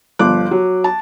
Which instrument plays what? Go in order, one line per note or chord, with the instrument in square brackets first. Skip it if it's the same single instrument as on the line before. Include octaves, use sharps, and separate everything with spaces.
[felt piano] G1 F3 D6 F#6
F#3
A5